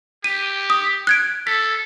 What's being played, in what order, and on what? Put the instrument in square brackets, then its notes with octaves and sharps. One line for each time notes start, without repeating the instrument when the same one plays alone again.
[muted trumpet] G4 [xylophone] D#7
[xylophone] D#6
F#6 G#6 D7
[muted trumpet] A4 [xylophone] B6